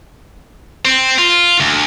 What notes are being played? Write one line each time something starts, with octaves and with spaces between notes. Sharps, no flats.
C4
F4
D2